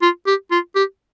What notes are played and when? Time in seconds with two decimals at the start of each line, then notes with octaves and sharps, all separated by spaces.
0.02 F4
0.27 G4
0.51 F4
0.76 G4